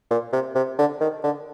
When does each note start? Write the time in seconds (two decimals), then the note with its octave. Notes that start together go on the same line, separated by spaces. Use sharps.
0.11 A#2
0.33 C3
0.55 C3
0.79 D3
1.01 D#3
1.23 D3